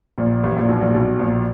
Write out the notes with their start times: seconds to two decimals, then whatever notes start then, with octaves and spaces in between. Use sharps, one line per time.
0.18 A#1 A#2
0.43 A1 A2
0.56 A#1 A#2
0.68 B1 B2
0.81 A#1 A#2
0.94 B1 B2
1.19 A#1 A#2